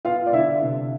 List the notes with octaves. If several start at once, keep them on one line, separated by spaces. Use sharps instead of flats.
B3 F4 F5
D5
D3 E4 E5
C3